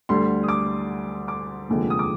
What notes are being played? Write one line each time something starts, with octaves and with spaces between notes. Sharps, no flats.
D2 D3 G3 C6
D#6
D6
D6
F1 D#2 D3 F3 G#3
D#6
D6